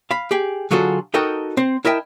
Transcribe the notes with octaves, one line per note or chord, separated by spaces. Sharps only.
F5 B5
G4 G#4 G5
D3 F#3 F4 F#4 G#4 A4
D#4 F#4 A4 A#4 D#5 G5
C4 C5
E4 A#4 D#5 E5 G5 A5